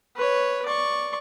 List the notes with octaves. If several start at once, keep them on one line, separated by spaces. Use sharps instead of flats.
B4 C#5
D5 C#6